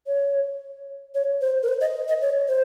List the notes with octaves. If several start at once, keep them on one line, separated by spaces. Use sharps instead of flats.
C#5
C#5
C5
A#4
C5
D#5
D#5
C#5
C5